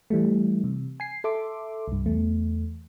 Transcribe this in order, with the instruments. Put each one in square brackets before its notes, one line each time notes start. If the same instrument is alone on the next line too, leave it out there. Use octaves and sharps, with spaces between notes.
[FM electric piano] E3 G3 A3
C3
G#5 C7
A4 E5 C6 D6
C2 G2
E2 A3